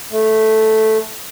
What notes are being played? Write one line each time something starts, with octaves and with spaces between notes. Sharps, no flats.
A3